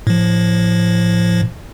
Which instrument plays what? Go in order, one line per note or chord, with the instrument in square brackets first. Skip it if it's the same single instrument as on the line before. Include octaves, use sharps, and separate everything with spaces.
[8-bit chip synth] A2 F3